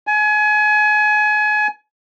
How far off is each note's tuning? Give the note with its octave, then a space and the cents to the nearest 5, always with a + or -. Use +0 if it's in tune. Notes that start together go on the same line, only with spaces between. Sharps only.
G#5 +30